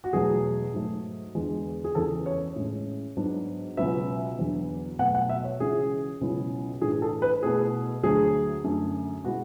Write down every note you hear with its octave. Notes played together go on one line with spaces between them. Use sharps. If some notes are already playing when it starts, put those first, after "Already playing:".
F#4
E2 B2 F#3 A3 G#4
G#2 F#3 A3
E2 D3 G#3
G#4
E2 C#3 E3 A4
C#5
A2 G#3 C#4
G#2 F#3 B3 D4
C#2 B2 F#3 B3 E5
E2 D3 F#3 B3
B2 F#3 A3 F#5
F#5
E5
C#5
C#2 C#3 E3 G#4
C#2 B2 F#3 C#4 E4
A2 E3 A3 D4 G#4
A4
B4
B2 A3 E4 G#4
D2 D3 F#3 A3 G#4
F#2 D3 A3
B2 G#3 B3 E4 F#4